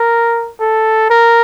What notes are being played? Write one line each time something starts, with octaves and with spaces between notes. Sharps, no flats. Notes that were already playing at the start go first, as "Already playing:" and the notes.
Already playing: A#4
A4
A#4